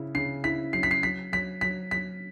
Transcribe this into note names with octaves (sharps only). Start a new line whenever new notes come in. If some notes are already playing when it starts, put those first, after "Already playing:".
Already playing: C#3 E4
C#3 C7
E4 B6
F#3 C7
B6
C7
F#3 B6
F#3 B6
F#3 B6
F#3 B6